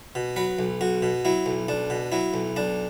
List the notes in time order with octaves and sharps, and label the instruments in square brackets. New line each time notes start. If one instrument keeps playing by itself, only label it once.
[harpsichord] B2
F#3 B4
B1
B1 F#4
B2
F#3 E4
B1
B1 D4
B2
F#3 E4
B1
B1 D4